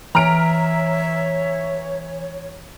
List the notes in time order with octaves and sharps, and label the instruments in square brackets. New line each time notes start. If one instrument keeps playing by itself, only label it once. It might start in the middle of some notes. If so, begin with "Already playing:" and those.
[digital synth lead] E3 [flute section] C#5 [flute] E5 [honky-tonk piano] A#5 F6 D7